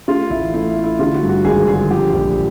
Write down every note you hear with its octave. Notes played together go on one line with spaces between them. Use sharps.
A3 F4
A1 E4
A3 E4
A3
E4
D3 F4
F#4
G2
F#4
G#1 G#4
D3 G#4
F3 G4
A#1